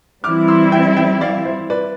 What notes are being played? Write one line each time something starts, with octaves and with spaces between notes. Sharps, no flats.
E3 G3 C4 E4 D6 F6
C6 E6
E5 G5
E5 G5
D5 F5
C5 E5
B4 D5